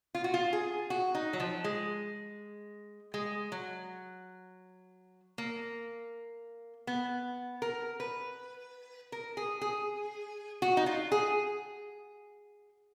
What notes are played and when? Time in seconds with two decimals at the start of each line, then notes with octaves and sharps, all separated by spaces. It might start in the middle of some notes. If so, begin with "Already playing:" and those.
0.15 F4
0.24 F#4
0.34 F4
0.53 G#4
0.90 F#4
1.15 D#4
1.33 F#3
1.40 F3
1.64 G#3
3.14 G#3
3.52 F#3
5.38 A#3
6.87 B3
7.62 A#4
8.00 B4
9.12 A#4
9.37 G#4
9.61 G#4
10.62 F#4
10.77 D#4
10.86 F4
11.12 G#4